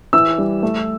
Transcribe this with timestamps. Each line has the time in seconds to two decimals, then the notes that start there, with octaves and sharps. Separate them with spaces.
0.13 E3 E6
0.38 G3
0.63 A3